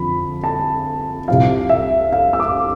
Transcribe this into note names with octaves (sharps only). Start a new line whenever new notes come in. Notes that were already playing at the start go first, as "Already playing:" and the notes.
Already playing: F2 D3 F3 B5
A5
C2 C3 F3 F5
E5
F5
E6
D6